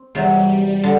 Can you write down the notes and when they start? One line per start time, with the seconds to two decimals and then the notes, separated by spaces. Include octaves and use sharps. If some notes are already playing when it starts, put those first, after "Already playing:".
Already playing: C4
0.14 E2 C3 F#3 G3
0.83 D3